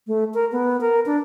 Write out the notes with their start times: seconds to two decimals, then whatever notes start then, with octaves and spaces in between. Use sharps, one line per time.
0.07 A3
0.34 A#4
0.52 B3
0.81 A#4
1.06 D4